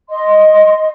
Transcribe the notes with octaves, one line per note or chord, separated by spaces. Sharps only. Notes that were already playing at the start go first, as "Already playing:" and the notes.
D#5 C6